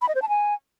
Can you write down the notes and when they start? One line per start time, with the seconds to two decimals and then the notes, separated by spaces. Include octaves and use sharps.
0.02 B5
0.08 D#5
0.15 C5
0.22 A5
0.29 G#5